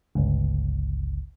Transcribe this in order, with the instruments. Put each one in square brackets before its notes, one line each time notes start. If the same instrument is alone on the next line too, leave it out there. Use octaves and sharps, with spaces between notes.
[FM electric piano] G1 C#2